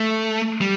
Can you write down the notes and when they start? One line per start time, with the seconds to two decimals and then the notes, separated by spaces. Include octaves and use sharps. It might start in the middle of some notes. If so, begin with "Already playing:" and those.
Already playing: A3
0.61 G3